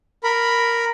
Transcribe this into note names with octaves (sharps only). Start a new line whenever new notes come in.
A#4 B5